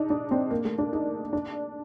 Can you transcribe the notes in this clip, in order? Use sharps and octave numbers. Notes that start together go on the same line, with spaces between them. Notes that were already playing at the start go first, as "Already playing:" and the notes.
Already playing: D4 D#4
D4
C4
A#3
A3
D4
D#4
D4